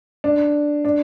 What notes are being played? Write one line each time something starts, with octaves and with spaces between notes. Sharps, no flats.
D4
D4